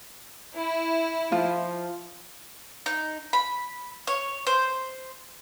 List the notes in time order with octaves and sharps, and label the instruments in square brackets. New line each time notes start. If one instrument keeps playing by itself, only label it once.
[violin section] E4
[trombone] F3 [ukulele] F4
[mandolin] D#4
B5
C#5
C5